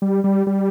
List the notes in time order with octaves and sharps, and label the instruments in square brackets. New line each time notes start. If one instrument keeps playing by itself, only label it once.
[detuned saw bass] G3
G3
G3